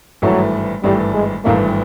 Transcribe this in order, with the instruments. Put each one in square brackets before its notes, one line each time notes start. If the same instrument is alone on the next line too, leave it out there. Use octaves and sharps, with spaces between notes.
[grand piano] G#1 G2 E3 A3 [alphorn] F#3
[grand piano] G#1 G2 E3 A3 [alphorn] G3
[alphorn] G#3
[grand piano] G#1 G2 E3 A3 [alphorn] A#3